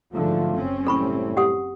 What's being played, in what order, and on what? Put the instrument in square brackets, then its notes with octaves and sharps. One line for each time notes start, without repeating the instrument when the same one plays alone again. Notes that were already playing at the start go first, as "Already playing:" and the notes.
[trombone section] B1 A3 F4 [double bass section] G#2 D3 F3
[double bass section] F#1 C4 C#4
[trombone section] A2 G3 [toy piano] A4 B5 C#6
[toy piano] G4 F#5 D#6